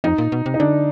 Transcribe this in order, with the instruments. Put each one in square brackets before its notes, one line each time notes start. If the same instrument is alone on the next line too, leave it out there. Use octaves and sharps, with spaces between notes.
[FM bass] F2 [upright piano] D#4
[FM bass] A#2
B2
C3
[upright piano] D#4
[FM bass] D3 [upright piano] D4